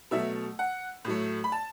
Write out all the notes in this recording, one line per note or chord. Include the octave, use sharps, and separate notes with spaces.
B2 F#3 A3 E5
F#5
A2 F#3 A3
B5
A5